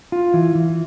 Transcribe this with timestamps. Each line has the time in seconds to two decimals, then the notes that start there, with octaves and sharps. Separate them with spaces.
0.12 F4
0.34 E3
0.55 E3